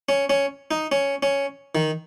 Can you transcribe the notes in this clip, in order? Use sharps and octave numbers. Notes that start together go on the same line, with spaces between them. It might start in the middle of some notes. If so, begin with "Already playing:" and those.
C#4
C#4
D#4
C#4
C#4
D#3